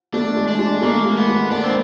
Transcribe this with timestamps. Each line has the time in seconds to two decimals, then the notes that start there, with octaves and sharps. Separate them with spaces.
0.14 A3 D4
0.36 G#3
0.48 D4
0.59 G#3
0.82 A3 A#3
1.05 G#3
1.17 B3
1.29 G#3
1.51 A#3 D4
1.63 C4